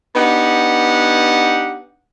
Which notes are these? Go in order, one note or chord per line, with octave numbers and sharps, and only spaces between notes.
B3 D4 D#4 G4 F#5